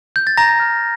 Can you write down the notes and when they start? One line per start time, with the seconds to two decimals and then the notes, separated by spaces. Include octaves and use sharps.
0.16 G6
0.27 A6
0.37 A#5 A#6
0.60 F6